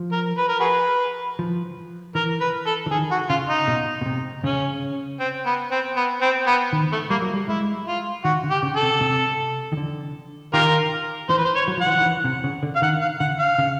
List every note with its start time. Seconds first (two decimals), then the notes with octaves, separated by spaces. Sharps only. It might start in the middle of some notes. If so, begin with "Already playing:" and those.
Already playing: F3
0.12 A#4
0.37 B4
0.49 A#4
0.60 F#4 G#4 B4
1.39 F3
2.15 E3 A#4
2.40 B4
2.66 A4
2.86 E3
2.91 D#3 G#4
3.11 F#4
3.29 C#3 F4
3.48 D#4
3.68 B2
4.01 B2
4.06 C3
4.43 C#3 C#4
5.20 C4
5.46 B3
5.71 C4
5.96 B3
6.22 C4
6.47 B3
6.73 D#3
6.92 A3
7.10 G3 A#3
7.22 F#3
7.34 G3
7.48 G#3 E4
7.87 F4
8.24 D#3 F#4
8.44 D3
8.50 G4
8.63 C#3
8.76 A4
8.82 C3
9.01 C3
9.72 D#3
9.77 D3
10.53 D#3 F4 G4 A#4
11.29 E3 C5
11.37 B4
11.45 C5
11.55 C#5
11.68 F#3
11.77 F3 F#5
11.87 E3
11.96 F3
12.01 D#3
12.06 E3
12.24 C3
12.44 C#3
12.63 D3
12.75 F5
12.82 D#3 F#5
13.01 F5
13.20 D3 F#5
13.39 F5
13.58 C#3